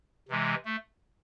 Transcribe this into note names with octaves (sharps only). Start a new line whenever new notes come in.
C3 E3 G#3
A3